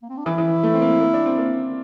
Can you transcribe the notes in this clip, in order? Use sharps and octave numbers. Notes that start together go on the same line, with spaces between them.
A#3
C4
D4
E3 E4
E3
A3
C4
A#3
A#3
D4
C4
A#3